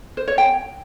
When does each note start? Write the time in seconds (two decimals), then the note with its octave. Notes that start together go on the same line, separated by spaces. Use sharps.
0.17 C5
0.28 C#5
0.38 G5